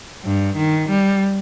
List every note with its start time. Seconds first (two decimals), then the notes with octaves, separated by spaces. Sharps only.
0.24 G2
0.57 D#3
0.90 G3